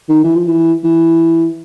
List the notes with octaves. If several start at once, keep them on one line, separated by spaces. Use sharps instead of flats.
D#3
E3
F3
E3
E3